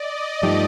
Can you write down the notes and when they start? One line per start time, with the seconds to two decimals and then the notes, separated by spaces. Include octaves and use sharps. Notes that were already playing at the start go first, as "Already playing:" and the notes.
Already playing: D5 D#5
0.14 D5
0.42 G2 F3 A3 D#4 G4